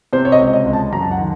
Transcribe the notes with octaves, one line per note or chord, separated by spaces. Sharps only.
C3 C5
C#5
D#5
C#2
D#5
C#2
A5
F#2 A#5
A5
F#5
D#3